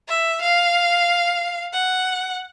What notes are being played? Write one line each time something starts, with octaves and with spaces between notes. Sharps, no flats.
E5
F5
F#5